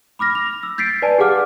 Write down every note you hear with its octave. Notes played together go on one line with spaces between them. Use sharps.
B5 D6 F6 A#6
F7
E6
G6 A6 B6 C7 D7
B4 D5 G#5 A5
G4 G#4 F5 F#5 D6 F6